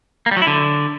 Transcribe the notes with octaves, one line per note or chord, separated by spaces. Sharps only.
A#3
G3
F#3
E4
D3